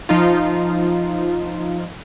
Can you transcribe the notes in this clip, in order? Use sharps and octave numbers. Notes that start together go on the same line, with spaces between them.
F3 D#4 F4